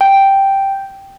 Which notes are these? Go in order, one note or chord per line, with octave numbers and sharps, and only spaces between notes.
G5